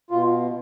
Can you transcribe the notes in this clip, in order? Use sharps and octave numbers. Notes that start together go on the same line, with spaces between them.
B2 F4